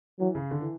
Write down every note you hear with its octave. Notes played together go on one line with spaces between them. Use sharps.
E3 F#3
C#3
D3
E3